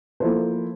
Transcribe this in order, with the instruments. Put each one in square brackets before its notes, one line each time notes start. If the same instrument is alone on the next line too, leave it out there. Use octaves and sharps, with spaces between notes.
[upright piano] F3 A#3 E4 A4 C5